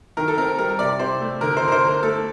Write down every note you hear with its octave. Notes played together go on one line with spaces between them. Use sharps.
D#3 A#4
A4
C4 A#4
G3 A#4
C3 D5
C3 C5
A3
D3 A#4
C5
D3
A#4
C5
D3
A#4
A3 A4